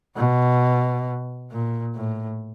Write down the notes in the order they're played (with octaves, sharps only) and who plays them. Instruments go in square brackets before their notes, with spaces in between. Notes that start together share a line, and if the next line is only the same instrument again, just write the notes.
[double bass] B2
A#2
A2